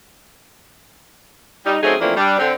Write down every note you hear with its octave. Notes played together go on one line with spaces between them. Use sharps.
G3 D#4
F#3 A3 C4 C#4 D#4 G#4
E3 F3 A3 A#3 C4 D4
G3 D4
D3 C4